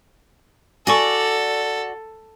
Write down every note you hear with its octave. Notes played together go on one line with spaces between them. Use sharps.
F#4 A4 D5 G#5 C#6